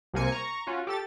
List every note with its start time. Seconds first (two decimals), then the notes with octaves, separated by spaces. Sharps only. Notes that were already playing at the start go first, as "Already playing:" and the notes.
0.13 C2 C3 A#3 C4 G#5 C#7
0.32 A#5 C#6
0.67 C#4 F4 F#4
0.87 G4 A4 A6